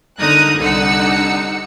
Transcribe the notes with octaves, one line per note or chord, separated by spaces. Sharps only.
D3 D#4 A#4 A#5 D#6 F#6
C2 D3 D#4 F#5 E6 C#7